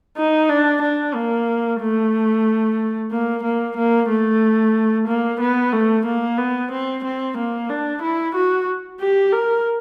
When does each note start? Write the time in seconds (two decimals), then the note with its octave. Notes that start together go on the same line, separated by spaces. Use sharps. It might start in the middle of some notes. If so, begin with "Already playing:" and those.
0.17 D#4
0.50 D4
0.82 D4
1.14 A#3
1.81 A3
3.11 A#3
3.44 A#3
3.77 A#3
4.09 A3
5.08 A#3
5.41 B3
5.73 A3
6.06 A#3
6.38 B3
6.72 C4
7.05 C4
7.38 A#3
7.70 D4
8.03 E4
8.36 F#4
9.00 G4
9.33 A#4